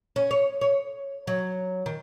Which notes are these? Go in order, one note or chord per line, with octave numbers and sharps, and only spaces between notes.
C#4
C#5
C#5
F#3
D#3